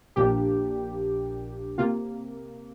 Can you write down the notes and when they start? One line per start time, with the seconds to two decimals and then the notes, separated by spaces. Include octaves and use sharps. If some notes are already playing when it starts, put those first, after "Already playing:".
0.16 A#1 A#2 F3 A#3 D4 G4
1.78 C3 A#3 F4